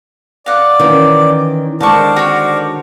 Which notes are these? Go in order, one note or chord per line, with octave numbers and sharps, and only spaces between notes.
D5 F5 F#5
D#3 E3 C#4
D3 D#3 G#3 A#4 C5 D5 A5 C#6
F#4 C#5